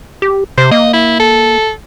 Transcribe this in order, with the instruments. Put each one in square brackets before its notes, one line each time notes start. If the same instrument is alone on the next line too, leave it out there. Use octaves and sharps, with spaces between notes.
[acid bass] G4
[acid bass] C3 [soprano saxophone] C5
[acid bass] A#3 [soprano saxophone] D#5
[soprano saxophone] E4
A4